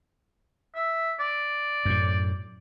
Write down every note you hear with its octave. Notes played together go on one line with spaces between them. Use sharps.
E5
D5
F#2 A2